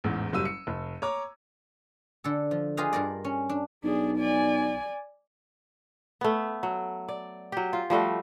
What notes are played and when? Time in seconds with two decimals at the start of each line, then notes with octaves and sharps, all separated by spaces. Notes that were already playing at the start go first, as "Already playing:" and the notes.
0.04 A1 E2 G#2
0.32 F#1 F#3 G3 E6 D#7
0.45 C#7
0.67 F1
1.02 C#5 A#5 D6
2.24 D3 A4
2.51 F3
2.77 F4 G4 G#4 B4 D#5 F5
2.93 G2 A#4 D5
3.25 C#4
3.49 D4
3.84 B1 D4 G#4
4.17 D5 G#5
6.21 A3 B3
6.63 F#3
7.08 D5
7.52 F#3 G4
7.73 F4
7.90 F3 G3 A3 F#4